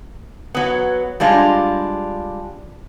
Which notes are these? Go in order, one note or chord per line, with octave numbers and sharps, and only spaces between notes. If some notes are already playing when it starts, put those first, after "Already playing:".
F#3 B3
G3 G#3 D4 F4